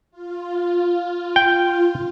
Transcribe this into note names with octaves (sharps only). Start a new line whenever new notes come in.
F4
G5